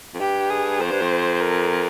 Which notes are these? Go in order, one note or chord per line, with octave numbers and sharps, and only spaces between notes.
F2
G2 G4
G#4
F2 C5
G2
F2
A#4